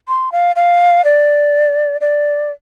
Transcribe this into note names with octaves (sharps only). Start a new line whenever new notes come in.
C6
F5
F5
D5
D5